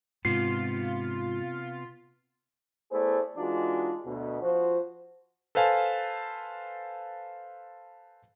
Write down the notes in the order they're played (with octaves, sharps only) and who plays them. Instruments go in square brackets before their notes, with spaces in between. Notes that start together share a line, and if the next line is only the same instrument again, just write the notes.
[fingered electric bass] G#2 [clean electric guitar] C3 B3 [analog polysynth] F4 [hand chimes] C7
[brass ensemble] A3 B3 E4 G#4 C5 D5
E3 G#3 D4 D#4 F4 F#4
D2 B2
F3 F#4 C5
[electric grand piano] A4 B4 C5 F5 G#5 A5